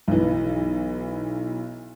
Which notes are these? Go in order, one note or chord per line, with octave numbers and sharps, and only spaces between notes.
B1 E3